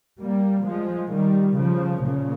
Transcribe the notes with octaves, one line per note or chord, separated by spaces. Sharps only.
G3 A#3
F3 G#3
D#3 G3
C#3 F3
A#2 C#3